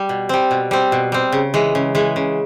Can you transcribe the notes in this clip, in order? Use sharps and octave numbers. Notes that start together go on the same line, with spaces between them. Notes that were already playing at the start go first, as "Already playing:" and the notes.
Already playing: G3
B2
G3 C4
B2
G3 C4
B2
G3 C4
C#3
E3 G#3
C#3
E3 G#3
C#3